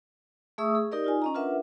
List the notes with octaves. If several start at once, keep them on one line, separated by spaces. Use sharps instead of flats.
A3 G#4 E5 C#6 D#6 E6
G#4
D#4 G4 A#4 D5 D#5
D#4 F4 G#5
C#4 D#5 A#5
D4 F4 A#4 B4 E5 F#5